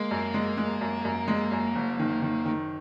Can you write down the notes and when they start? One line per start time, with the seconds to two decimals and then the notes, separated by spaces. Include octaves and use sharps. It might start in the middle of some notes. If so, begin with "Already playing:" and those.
Already playing: G#3 A#3
0.11 F#2
0.34 G#3
0.58 G#3
0.81 F#2
1.05 F#2
1.28 G#3
1.52 F#2
1.76 F#1
1.99 D#3
2.22 D#3
2.46 D#3